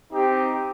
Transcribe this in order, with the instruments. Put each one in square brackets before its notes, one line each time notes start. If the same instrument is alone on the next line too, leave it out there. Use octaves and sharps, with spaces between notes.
[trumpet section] C4 D#4 G4